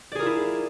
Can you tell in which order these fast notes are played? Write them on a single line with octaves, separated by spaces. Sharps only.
D5 G#4 A#4 F4 E4